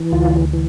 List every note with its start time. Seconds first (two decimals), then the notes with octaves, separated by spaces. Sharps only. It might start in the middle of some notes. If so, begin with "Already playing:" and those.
Already playing: E3
0.12 D2 F4
0.53 E3